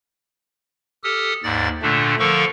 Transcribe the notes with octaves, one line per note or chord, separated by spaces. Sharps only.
G4 A4 D#6 F6
D#2 G#2 D5 A6
A#2 D3 A3 D4
D3 F3 A4 A#4 F5 C#6